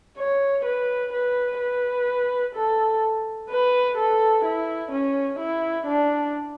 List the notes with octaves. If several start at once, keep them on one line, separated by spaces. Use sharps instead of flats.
C#5
B4
B4
B4
A4
B4
A4
E4
C#4
E4
D4